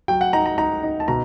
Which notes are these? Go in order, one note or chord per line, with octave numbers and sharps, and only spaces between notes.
F#3 G5
F#5
D#4 A#5
A#5
D#4 A#5
D#4
A5
B2 A#5